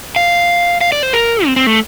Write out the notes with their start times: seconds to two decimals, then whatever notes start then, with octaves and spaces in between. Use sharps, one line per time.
0.16 F5
0.81 F5
0.92 D5
1.03 C5
1.13 A#4
1.46 C4
1.56 C4
1.67 A3